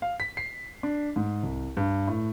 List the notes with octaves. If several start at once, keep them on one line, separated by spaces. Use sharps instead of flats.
F5
B6
C7
D4
G#2
C2
G2
A2